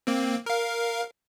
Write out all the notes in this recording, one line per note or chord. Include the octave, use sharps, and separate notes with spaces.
A#3 C4
A#4 F5